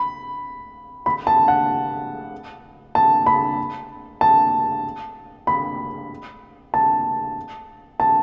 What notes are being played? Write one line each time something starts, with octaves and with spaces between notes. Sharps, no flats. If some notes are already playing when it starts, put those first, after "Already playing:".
Already playing: B5
B5
A5
F#5
A5
B5
A5
B5
A5
A5